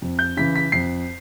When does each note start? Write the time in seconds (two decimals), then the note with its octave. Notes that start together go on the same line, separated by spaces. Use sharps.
0.02 F2
0.19 G6
0.37 C#3 E3 B6
0.56 B6
0.72 F2 C7